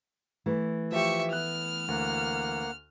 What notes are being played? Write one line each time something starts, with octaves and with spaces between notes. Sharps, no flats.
E3 A3
F3 G4 E5 C#6
B3 F6 F#6
D2 A#3 F#5